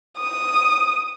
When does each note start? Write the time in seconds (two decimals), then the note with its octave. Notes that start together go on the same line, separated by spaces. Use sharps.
0.19 D#6